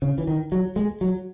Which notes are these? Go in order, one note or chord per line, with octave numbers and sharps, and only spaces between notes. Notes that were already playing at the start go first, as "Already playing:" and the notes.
C#3
E3
D#3
F#3
G#3
F#3